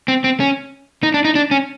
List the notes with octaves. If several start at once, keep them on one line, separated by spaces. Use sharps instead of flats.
C4
C4
C#4
D#4
D4
D#4
D4
C#4